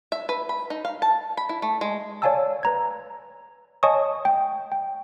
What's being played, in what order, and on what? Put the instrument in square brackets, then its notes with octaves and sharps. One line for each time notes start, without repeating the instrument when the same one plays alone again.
[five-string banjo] E5
B4
B5
D#4
F5
A5
B5
E4
A3
G#3
[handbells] C#5 D5 F5 G#5 A5 E6
B4 A#5 G#6
C#5 D#5 G#5 A5 C#6 D#6
G5
G5